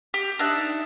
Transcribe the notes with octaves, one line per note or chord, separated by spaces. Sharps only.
G4
D4 D#4 E5 F#6